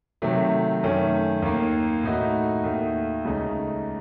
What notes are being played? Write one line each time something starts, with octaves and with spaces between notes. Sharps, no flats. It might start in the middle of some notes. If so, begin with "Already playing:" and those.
C3 D#3 F#3 A3
F#2 D#3 A3 C#4
D#2 D#3 A#3
A2 A3 D#4 F#4
D#2 D#3 A3
C#2 C#3 A3 D#4